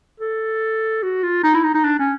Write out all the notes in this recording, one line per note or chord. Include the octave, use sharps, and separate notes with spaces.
A4
F#4
F4
D#4
E4
D#4
D#4
D4
C#4